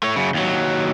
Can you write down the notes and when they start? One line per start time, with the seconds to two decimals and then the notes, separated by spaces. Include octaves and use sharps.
0.03 A3 C#5
0.16 F#2 C#3
0.34 D#2 F#3